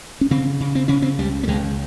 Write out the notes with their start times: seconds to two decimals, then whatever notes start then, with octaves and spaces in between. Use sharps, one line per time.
0.21 C#4
0.31 C#3 C4
0.60 C#3
0.75 C4
0.88 C#3 C#4
1.02 C4
1.19 C#2 G3
1.43 A#3
1.48 C#2 G#3